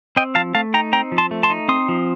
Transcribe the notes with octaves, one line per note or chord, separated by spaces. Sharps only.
C4 D#5 G5
F3 F5 A5
A3 F5 A5
D#4 G5 A#5
C4 G5 A#5
F3
A5 C6
A3
A5 C6
D#4
C4 C6 D#6
F3